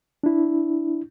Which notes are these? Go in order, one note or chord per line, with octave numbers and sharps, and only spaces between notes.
D4 E4